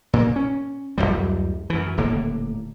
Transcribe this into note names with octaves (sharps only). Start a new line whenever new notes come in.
A#2 A#3
C#4
D1 C2 F#2 G3
F#2 E3
D#1 A2 D3 A#3